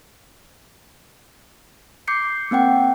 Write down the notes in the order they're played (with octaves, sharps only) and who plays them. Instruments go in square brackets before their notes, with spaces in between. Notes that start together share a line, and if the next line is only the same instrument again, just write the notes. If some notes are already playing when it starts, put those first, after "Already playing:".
[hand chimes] D6 G6 C7 C#7
A#3 C4 F#5 G5